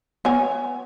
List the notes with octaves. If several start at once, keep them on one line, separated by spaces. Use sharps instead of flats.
B3 C#5 G#5